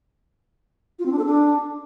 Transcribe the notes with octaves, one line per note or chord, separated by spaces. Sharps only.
F4
C4
D4
A4
D4